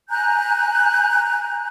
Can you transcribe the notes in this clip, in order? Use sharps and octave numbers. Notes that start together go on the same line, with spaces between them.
G#5 A#5 F#6 G6